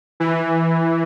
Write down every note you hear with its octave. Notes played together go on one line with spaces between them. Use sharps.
E3